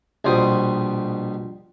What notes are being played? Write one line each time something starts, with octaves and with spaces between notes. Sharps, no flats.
A#1 B2 G3 C5 D#6